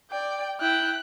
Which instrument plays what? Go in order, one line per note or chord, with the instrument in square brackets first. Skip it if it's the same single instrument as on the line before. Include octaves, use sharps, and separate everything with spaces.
[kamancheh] D5 [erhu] G5
[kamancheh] E4 [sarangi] G5 [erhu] F#6